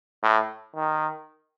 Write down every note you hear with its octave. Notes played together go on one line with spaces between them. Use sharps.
A2
D#3